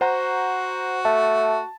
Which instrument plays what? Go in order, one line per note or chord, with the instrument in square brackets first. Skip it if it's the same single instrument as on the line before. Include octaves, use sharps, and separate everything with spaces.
[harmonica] F#4 [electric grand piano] C5 F#5 A#5
[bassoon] A3 [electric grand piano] A5